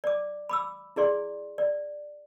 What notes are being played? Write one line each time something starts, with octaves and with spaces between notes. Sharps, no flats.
D5 D6
B5 D6 E6
E4 G#4 D5 C6
D5